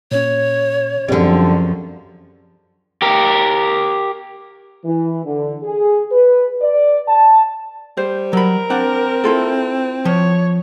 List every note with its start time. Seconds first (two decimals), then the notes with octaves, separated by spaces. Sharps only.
0.11 A#2 C#4 C#5
1.08 C#2 F#2 D3 F3 G3 C4 G#4
3.02 G4 A#4
4.85 E3
5.25 D3
5.63 G#4
6.11 B4
6.61 D5
7.08 A5
7.97 G3 C5
8.33 F#3 A#4 B5
8.70 C4 D4 F#5
9.24 E4 F4 A4
10.05 F3 C#5